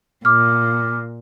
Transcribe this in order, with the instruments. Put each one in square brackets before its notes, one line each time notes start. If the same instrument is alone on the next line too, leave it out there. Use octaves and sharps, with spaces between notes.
[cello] A#2 [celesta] D6 F6